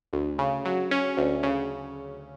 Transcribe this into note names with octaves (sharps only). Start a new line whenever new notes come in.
D2
C#3
F#3
C#4
D2
C#3